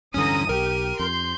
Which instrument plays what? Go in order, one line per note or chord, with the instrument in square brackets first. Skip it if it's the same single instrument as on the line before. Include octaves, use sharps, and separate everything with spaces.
[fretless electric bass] D1 G2 E3 [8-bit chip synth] D3 C#4 [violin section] A#5 D#6 [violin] D#7
[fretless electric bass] B1 [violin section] G4 [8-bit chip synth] A#4
[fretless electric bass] F2 [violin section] C6 [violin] G6